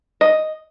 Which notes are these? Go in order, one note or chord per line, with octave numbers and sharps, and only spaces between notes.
D#5